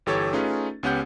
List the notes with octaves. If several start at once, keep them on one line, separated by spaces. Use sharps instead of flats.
G1 E3 G4 A4 C#5 A6
A3 C#4 D#4 F4 G#4 B4
C#2 B3 C#4 G4 F#5 G6